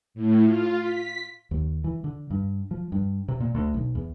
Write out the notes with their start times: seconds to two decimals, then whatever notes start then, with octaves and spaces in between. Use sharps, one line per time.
0.14 A2
0.44 F4
0.80 B6
1.51 D#2
1.84 E3
2.04 D3
2.31 G2
2.71 F3
2.92 G2
3.28 C3
3.40 A#2
3.55 D2
3.74 B1
3.95 E2